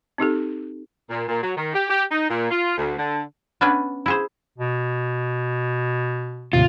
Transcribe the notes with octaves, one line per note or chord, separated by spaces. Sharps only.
C4 D#4 G4 A4
A#2
A#2
F#3
D#3
G4
G4
D#4
A#2
F4
D2
D3
B3 C#4 D4 B4 E5 G#5
E4 G#4 C5
B2
D#2 A2 C3 F4